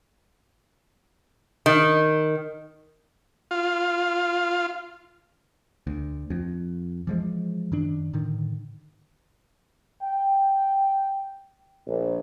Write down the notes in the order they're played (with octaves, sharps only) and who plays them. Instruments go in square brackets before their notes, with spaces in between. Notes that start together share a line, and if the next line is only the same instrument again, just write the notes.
[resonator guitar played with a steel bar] D#3
[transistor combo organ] F4
[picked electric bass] D2
F2
E3 F3 G#3
F#2 D#3 D4
A2 D3 D#3
[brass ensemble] G5
A#1